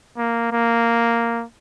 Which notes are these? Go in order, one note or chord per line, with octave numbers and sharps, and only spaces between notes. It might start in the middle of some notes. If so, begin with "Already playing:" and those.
A#3
A#3